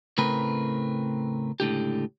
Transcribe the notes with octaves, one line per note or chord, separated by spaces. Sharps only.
A2 C#3 A3 C4 A#4 B4
C#2 A2 D3 G4